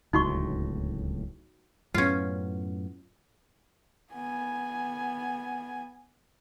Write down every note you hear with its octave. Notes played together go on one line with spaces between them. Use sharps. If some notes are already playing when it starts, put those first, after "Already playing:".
D1 C#2 A2 D#4 F#4 C#6
F#2 A2 B3 C#4 F4
B3 G#5